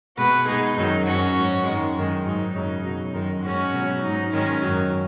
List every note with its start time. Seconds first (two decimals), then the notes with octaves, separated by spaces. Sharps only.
0.18 B2 G#3 F#4 B4
0.47 B2 G#3 D#4 G#4
0.78 F#2 D#3 F#3 D#4
1.06 F#2 F#3 C#4 F#4
1.37 G#2 F#3
1.66 F#2 D#3 G#3
1.96 F#2 D#3 G#3
2.25 G#2 F#3 D#4
2.54 F#2 C#3 F#3 D#4
2.85 B2 F#3 D#4
3.13 F#2 D#3 G#3
3.43 G#2 G#3 C#4 F#4
3.73 B2 F#3
4.02 G#2 F#3 D#4
4.32 G#2 D#3 G#3 C#4
4.61 F#2 D#3 F#3